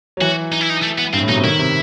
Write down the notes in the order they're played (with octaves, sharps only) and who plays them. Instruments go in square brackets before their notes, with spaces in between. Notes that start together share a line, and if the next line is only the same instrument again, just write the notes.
[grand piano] F#3
[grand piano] E3 [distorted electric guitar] F#4
[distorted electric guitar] D#4
E4
D#4
A3
B3
[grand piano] G2 [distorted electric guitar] C4
[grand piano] A2
[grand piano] B2 [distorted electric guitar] D#4
[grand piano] C3
[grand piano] D#3 [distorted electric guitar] E4
[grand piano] C3